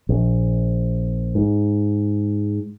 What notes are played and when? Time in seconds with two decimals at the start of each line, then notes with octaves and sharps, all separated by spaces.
0.09 A#1
1.35 G#2